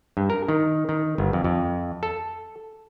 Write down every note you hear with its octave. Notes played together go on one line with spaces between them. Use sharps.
G2
A#4
D#3
D#3
G1
F2
F2
A4